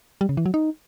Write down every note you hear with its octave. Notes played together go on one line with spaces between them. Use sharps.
G3
C#3
E3
F#3
D#4